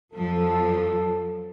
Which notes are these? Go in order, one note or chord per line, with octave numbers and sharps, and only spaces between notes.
F2 F3 F#3 A4